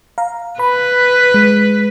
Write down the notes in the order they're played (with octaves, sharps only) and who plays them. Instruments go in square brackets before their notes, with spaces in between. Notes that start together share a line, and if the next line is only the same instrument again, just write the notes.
[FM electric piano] F5 A#5
[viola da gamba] B4 [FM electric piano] B5
[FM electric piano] G#3